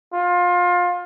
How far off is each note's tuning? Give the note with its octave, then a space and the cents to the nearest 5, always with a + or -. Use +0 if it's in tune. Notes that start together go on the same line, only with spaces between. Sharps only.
F4 +25